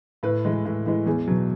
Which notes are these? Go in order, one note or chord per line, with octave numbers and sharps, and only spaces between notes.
A2 B4
E3 G#3
A2
E3 G#3
E2 G#4
B2 F#3